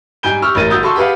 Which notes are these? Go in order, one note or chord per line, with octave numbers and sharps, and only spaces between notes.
G#2 G3 G#5 G6 D7 G7
G4 C#6 E6 F6
A1 G#2 C#4 A#4 A6 D#7
G1 F#4 D#6 E6 G6 A6
F#4 A4 C6 C#6 E6
G4 G#4 B4 F5 F#5